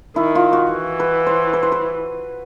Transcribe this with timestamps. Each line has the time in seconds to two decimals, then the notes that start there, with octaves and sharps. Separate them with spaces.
0.16 D#3 E4
0.35 F4
0.53 F#4
0.71 E3
1.00 B4
1.27 C5
1.53 B4
1.63 C5
1.72 B4